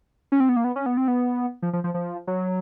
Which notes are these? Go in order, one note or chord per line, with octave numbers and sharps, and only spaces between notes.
C#4
C4
B3
A#3
B3
C#4
B3
C4
B3
F3
F3
F3
F3
F#3